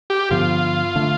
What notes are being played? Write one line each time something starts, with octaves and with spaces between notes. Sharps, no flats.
G4
G2 D3 F3 B3 F4
D3 A3 D4